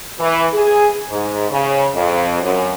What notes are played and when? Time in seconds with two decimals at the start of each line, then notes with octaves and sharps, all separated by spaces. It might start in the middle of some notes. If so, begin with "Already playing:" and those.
0.20 E3
0.53 G#4
1.08 G#2
1.50 C#3
1.95 F2
2.42 F#2